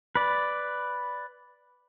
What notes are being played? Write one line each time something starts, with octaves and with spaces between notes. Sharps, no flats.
B4 D5